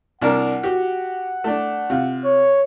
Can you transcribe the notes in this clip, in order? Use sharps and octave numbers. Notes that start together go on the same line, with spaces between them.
C2 D4 A#4 F#5
F#4 G4
A3 D4
C3 F4
C#5